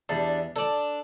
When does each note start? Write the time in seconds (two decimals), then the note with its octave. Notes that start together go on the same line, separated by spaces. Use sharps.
0.09 E2 G3 D4
0.56 D4 A4 D5